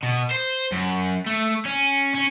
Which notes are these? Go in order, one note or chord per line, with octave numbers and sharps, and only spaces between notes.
B2
C5
F#2
A3
C#4
C#4